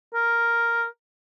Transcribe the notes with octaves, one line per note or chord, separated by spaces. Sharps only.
A#4